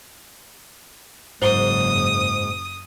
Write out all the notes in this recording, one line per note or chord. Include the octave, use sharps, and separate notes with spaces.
F#1 G#2 C5 D#6 G7